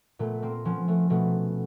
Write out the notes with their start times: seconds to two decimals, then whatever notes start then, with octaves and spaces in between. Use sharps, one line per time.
0.19 A#2 A3 B3
0.42 A#3 C4
0.65 F3 B3 C#4
0.88 A3 B3
1.10 B2 A3 B3